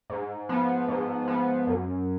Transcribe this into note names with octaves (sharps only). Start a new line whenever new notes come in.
G#2
F3 B3
G#2
F3 B3
F#2